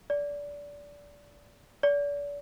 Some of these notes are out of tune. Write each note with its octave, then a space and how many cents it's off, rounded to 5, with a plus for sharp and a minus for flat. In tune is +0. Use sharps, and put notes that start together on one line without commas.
D5 -20
D5 -35